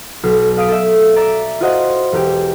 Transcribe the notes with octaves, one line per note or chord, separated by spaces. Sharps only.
B1 F6 C7
F5 D#6 B6 C7 D7
A4 E5
D5 E5 A#5 A6 D7
F4 F#4 C5 D#5 F#5
E1 G4